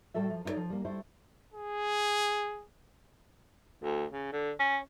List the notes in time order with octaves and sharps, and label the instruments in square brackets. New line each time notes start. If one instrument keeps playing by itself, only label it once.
[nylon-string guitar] A2 G3 F#4 A4 E5
F3
D#4 E4 A4 C#5 D5
F3
G3 A#3
G3 A3 E4 C5
[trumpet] G#4
[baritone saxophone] D2
C#3
D3
C#4